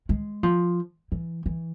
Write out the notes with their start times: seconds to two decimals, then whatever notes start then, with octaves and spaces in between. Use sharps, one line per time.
0.09 G#3
0.43 F3
1.12 E3
1.46 E3